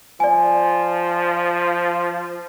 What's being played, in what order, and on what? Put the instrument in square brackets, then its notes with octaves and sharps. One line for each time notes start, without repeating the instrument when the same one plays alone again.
[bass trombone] F3 [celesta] D5 G#5